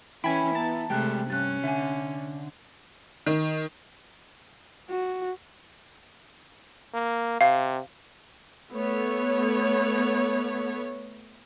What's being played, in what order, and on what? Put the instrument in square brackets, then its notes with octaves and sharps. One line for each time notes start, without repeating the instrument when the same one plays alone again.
[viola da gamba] E3 C#4 [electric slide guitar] E4 [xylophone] G5 [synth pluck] G#5 B5
[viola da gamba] B3 [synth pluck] A5 [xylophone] A#5
[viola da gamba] C3 A3 [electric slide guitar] G#3 G4 [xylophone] G5 F#6
[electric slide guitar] G2 [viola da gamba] C#4 [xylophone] F#6 A6
[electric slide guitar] D3 [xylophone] E5 G#5
[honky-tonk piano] D#3
[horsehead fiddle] F#4
[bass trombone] A#3
[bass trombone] C3 [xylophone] F5
[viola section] A3 B3 C#5